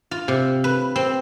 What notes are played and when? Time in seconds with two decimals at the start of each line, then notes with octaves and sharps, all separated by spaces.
0.11 F4
0.28 C3
0.64 B4
0.96 C4